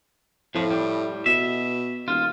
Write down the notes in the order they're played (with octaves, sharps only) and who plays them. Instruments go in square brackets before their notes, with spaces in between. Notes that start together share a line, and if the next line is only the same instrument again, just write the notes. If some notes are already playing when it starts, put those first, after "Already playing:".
[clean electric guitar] F2 F3 [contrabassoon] A2
[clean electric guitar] G3
[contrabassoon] B2 [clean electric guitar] E5
[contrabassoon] D#1 [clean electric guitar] F4